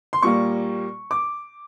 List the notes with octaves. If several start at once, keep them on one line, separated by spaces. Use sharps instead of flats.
C6
A#2 G3 A#3 C#6
D6